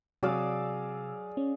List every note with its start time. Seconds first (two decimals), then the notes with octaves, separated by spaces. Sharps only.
0.23 C3 F#3 G#4 D5 F5 E6
1.37 C#4